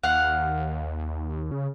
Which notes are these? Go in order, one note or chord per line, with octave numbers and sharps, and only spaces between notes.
D#2 F5 F#5
C#3